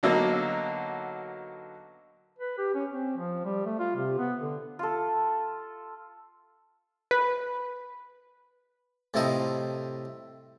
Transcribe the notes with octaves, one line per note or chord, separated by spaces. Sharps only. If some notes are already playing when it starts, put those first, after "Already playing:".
D3 F#3 A#3 B3 D#4
B4
G4
C#4
C4
F3
G3
A3
F4
C3
B3
D3
F4 A4
B4
A2 C3 F3 E4 C5 D#5